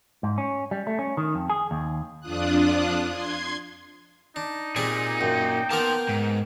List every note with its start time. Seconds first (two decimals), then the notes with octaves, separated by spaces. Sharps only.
0.23 G#2
0.38 C#4
0.71 G3
0.87 A3
0.99 C#4
1.17 D#3
1.35 F2
1.50 G#4
1.71 D#2
2.21 F2 D4 F4 D#6 F#6
3.08 C6 G#6
4.36 D4 D#4
4.76 A#2 G3 C4 G#4
5.21 F#2 G5
5.71 A#3 B3 A#4 A5 C6
6.09 G#2